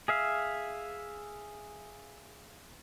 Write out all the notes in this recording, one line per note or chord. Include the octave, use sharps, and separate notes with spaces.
G#4 E5 F5